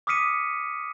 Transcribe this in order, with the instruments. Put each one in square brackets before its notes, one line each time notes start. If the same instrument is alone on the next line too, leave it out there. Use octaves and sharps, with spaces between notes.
[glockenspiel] D6 D#6 F6 B6 C#7 D#7